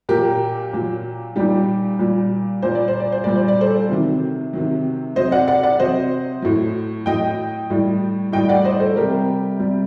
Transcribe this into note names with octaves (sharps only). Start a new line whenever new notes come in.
A#2 F#3 G4 A#4
A#2 F#3
A#2 G3 D#4 G4
A#2 G3
A#2 G3 C5
D5
C5
D5
C5
A#2 G3 D5
C5
D5
A4 C5
C3 D#3 F#3
C3 D#3 F#3
C3 F#3 C5 D#5
D5 F#5
D5 F#5
D5 F#5
C3 F#3 C5 D#5
A2 F#3
A2 F#3 D#5 G5
A2 G3
A2 G3 D#5 G5
D5 F#5
C5 D#5
A4 C5
C3 G3 G4 A#4
C3 G3